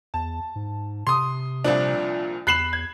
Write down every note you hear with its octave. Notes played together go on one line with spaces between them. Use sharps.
E2 A5
G#2
C3 C6 D#6
C2 A#2 F3 D4
E2 B5 F#6 C7 E7 F#7
G#6